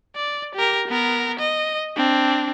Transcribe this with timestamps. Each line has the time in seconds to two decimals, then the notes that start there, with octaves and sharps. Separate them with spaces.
0.16 D5
0.55 G4 A#4
0.88 B3 A#4
1.39 D#5
1.96 C4 D4